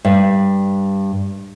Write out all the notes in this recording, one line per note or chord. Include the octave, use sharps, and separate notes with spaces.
G2